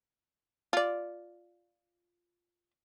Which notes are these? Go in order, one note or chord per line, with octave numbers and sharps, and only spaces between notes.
F4 D5